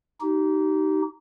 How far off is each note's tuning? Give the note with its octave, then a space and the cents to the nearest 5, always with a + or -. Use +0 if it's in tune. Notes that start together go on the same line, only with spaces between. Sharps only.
D#4 +0 G4 -30